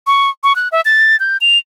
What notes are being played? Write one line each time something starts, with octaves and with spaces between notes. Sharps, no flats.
C#6
C#6
F#6
E5
A6
G6
F7